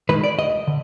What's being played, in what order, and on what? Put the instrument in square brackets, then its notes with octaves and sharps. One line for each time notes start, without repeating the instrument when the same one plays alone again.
[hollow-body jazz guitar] D#3 G#3 B4
D5
D2 D#5
D3